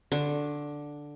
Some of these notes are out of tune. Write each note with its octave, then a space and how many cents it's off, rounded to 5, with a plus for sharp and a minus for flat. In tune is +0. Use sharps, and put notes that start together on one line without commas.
D3 +0 C#6 -40